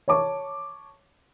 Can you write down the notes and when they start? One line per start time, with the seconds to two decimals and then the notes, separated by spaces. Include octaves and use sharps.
0.08 C#5 A5 C#6 D6